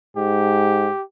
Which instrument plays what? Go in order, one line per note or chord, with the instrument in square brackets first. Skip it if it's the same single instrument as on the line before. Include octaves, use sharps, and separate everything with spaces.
[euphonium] G#2 [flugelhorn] G4